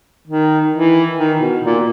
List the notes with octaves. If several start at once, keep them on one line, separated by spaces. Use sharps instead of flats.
D#3
E3
D#3
B2
A#2